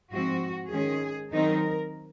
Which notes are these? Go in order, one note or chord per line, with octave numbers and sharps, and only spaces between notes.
G#2 F3 C4 F#4
D#3 G#3 C#4 G#4
D#3 F#3 C4 D#4 A#4